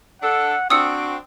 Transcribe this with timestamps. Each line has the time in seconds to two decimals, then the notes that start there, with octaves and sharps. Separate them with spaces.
0.22 D4 A4 F#5
0.70 C4 D4 F#4 D#6 E6 C#7